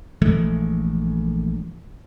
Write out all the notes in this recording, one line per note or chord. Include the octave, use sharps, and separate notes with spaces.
A#1 E3 G#3 A3